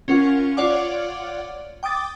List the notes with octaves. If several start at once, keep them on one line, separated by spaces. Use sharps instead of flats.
C#4 F4 A#4 F#5 C#6
F4 C#5 D5 F#5 D6
G5 D6 D#6 A6